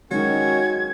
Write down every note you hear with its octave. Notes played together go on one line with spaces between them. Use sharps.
D#3 F#3 G#3 C#4 D#4 F#4 G#6